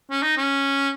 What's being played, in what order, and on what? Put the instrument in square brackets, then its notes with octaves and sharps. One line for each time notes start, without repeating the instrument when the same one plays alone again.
[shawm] C#4
D#4
C#4